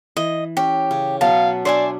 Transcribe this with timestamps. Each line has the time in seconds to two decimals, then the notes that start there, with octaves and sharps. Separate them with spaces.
0.17 E3 D#5
0.57 C#4 G4
0.91 C#3
1.21 B2 F#3 F5 A5
1.65 D4 C5 D5 E5 G#5